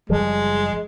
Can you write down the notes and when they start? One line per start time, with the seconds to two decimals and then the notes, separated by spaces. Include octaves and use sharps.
0.10 F#1 F3 G3 G#3